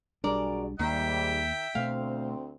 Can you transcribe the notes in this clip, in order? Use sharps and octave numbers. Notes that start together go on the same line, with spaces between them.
B1 G3 D4 F#4 G#4 A#4 D5
D#2 G#2 D#3 G3 A#3 E5 G5
D2 B2 A3 C4 F5